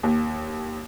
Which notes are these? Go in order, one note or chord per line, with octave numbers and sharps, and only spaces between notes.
D#2